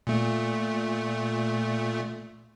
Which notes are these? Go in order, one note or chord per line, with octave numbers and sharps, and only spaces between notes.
A#2 A3